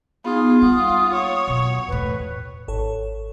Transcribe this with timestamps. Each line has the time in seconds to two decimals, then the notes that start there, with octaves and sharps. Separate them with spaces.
0.25 B3 D#4 F4 G#4
0.62 G3 A#3 F#5 D#6
1.14 C#5
1.47 B2 F#3
1.88 E2 A2 B4
2.68 G#1 A4 C#5